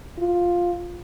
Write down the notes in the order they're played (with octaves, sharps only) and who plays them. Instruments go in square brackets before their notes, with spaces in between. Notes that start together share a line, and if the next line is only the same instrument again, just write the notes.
[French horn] F4